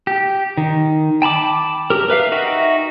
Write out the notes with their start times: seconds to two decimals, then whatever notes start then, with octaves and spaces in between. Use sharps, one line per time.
0.07 G4
0.57 D#3
1.22 G5 A5 B5 D6
1.90 G4 A#4
2.08 A#4 B4 E5 F5
2.32 D#4 F#4 E5 G5